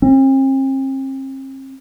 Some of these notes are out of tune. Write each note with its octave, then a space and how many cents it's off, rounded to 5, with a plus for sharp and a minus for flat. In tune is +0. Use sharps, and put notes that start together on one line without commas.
C4 +45